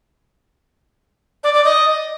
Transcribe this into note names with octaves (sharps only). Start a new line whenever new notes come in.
D5
D5
D#5